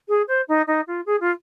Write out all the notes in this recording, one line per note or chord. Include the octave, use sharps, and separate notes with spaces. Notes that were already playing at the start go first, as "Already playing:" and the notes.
G#4
C5
D#4
D#4
F4
G#4
F4